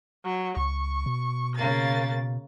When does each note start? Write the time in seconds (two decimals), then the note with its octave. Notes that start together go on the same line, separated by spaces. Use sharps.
0.25 F#3
0.57 C#2 C#6
1.06 B2
1.55 C#3 A#3 A6